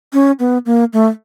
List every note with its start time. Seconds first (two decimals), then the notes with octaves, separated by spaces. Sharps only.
0.13 C#4
0.39 B3
0.66 A#3
0.93 A3